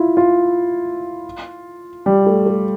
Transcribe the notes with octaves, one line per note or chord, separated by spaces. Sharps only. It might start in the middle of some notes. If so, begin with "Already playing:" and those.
Already playing: E4 F4
F4
G3
A3
A3